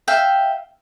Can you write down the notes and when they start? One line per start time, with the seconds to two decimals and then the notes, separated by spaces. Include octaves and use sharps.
0.08 E5 F5 G5